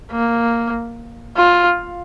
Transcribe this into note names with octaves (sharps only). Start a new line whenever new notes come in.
A#3
F4